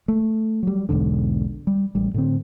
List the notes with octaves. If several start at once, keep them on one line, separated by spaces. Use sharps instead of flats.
A3
F#3 G3
B1 E2 G#2 D3
G3
A1 G3
A2 D3 C4